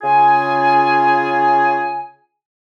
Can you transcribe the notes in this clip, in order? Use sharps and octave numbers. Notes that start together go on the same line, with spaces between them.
C#3 F4 G#4 G#5